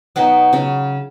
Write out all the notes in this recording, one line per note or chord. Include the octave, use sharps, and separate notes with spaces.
B2 F#3 B3 D#4
C#3 F#3